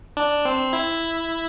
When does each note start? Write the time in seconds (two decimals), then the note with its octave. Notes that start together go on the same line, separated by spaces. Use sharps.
0.17 D4
0.45 C4
0.73 E4